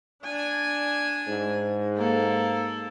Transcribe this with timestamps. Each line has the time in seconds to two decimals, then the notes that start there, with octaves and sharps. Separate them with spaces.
0.24 D4 G#5
1.27 G#2
1.97 A#3 A4